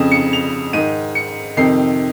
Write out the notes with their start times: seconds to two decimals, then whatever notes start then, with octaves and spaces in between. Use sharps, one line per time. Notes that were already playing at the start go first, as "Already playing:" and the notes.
Already playing: F2 C#3
0.12 C#7
0.33 F7
0.73 G#2 D#3 D#7
1.15 C#7
1.57 F2 C3 D#3 C7